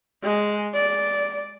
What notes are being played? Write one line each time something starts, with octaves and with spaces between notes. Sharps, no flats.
G#3
D5